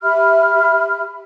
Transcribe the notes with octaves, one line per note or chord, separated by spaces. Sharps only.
G4 E5 B5 F6